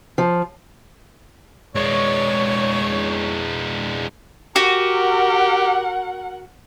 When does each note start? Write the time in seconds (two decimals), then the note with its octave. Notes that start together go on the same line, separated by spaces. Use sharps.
0.18 F3
1.76 G#3 D4 C#5
4.56 F#4 G4 A#4 F#5